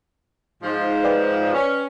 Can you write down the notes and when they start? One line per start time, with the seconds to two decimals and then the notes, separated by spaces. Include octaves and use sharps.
0.63 G#2 F3
1.04 B4 D5 G5
1.54 C#4